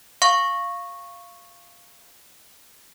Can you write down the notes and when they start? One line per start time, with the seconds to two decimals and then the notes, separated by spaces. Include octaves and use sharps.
0.22 F5 C#6